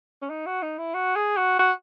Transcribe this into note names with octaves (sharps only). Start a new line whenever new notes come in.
C#4
D#4
F#4
D#4
E4
F#4
G#4
F#4
F#4